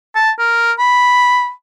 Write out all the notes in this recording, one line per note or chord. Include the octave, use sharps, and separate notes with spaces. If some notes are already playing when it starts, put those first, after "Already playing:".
A5
A#4
B5